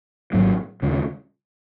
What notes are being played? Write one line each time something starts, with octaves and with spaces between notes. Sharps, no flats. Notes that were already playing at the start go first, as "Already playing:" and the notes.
G#1 G#2 F#3 A#3
D#2 C#3 G#3